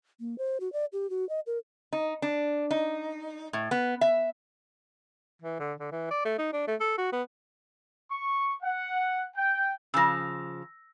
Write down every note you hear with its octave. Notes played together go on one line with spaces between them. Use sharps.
A#3
C5
F#4
D5
G4
F#4
D#5
A#4
D#4
D4
D#4
A2
B3
E5
E3
D3
D3
E3
D5
A3
D#4
D4
A3
A4
F#4
B3
C#6
F#5
G5
C#3 F3 E6 A#6